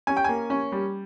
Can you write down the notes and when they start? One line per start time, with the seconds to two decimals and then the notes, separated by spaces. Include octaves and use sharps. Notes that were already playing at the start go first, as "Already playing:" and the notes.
0.07 C#4 G#5
0.17 G5
0.24 A#3 G#5
0.50 C#4
0.72 G3